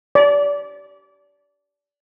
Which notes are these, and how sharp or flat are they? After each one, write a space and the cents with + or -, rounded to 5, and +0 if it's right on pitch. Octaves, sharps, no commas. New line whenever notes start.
D5 -25